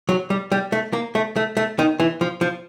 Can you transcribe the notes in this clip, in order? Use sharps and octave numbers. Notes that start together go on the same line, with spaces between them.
F#3
G3
G3
A3
A#3
A3
A3
A3
D#3
E3
F3
F3